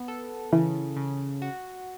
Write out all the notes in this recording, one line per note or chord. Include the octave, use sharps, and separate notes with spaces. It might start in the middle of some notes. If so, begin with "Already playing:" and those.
Already playing: B3
A4
C#3 E3
C#3
F#4